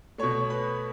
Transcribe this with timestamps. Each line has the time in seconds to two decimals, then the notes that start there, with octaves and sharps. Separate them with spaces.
0.18 B2 A3 C#5 C#6
0.50 B4 B5